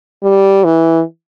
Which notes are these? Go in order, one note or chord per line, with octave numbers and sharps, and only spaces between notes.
G3
E3